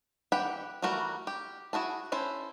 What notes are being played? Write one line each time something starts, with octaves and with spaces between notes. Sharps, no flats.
E3 G4 F#5 G5 B5
E3 G3 A3 F#4 A#4
G4
E4 F#4 G#4 A5
C#4 E4 A4 C5